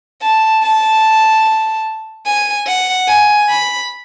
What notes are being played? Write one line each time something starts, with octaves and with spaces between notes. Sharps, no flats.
A5
A5
G#5
F#5
G#5
B5